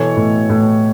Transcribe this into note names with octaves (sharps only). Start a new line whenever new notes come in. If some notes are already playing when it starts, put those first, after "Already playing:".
Already playing: B2 E3 A4 C#5
A2
A2